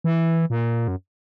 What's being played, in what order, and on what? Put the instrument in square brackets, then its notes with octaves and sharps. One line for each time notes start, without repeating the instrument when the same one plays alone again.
[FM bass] E3
A#2
F#2